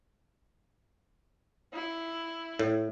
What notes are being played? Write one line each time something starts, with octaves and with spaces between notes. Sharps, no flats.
E4
A2